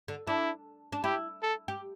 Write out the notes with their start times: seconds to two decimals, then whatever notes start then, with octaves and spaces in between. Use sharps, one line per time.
0.08 D3
0.27 D4 E4
0.92 D4
1.04 E4 G4
1.42 A4
1.68 G4